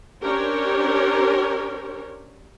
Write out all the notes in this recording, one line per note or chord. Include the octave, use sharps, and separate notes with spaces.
C#4 D4 G4 A#4 C5 C#5